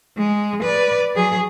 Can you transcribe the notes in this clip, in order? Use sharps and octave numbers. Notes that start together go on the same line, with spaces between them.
G#3
B4 D5
F#3 G#4